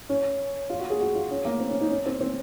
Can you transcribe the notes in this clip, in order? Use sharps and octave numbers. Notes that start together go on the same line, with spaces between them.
C#4
F4
F#4
G#4
F#4
F4
C#4
A#3
C4
C#4
D#4
C#4
C4
C4